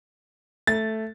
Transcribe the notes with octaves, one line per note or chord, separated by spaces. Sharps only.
A3 A6